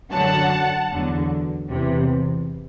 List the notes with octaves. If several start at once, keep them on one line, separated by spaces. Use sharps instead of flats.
F#2 D3 F#3 F#5 A5
E2 D3 F#3
E2 C3 E3